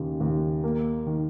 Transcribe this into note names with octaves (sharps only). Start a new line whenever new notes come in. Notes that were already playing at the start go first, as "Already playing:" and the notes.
Already playing: D#2 C#3
D#2
A#3
D#3